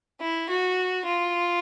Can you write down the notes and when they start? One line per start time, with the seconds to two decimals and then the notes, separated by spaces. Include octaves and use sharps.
0.21 E4
0.49 F#4
1.05 F4